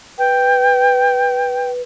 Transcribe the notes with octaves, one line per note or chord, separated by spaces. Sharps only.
B4 G5